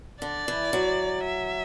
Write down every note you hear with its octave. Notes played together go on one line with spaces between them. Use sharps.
D3 D5
E3
F#3
E5